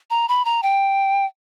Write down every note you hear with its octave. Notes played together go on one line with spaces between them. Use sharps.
A#5
B5
A#5
G5